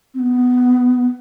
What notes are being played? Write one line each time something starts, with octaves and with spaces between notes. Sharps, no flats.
C4
B3